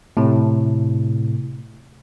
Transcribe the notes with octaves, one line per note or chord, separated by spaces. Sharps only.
A2 C3